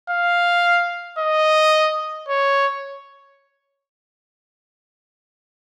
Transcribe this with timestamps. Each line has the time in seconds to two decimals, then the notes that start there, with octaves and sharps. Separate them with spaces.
0.10 F5
1.19 D#5
2.28 C#5